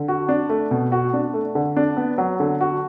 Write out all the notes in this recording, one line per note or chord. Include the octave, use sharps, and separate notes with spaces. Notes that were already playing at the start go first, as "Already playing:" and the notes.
Already playing: D3
F#4
D4
A3
B2
F#4
D4
A3
D3
D4
B3
F#3
D3
F#4